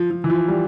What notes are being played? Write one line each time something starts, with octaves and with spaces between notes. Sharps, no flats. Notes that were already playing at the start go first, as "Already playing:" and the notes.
Already playing: F3
F3
E3
F3
G3